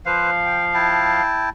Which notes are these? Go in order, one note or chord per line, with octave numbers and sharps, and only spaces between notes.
F3 B4 C5 F5
G5
E4 G5 A5